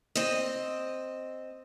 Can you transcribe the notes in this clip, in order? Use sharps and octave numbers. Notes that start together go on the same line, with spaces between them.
C4 D#5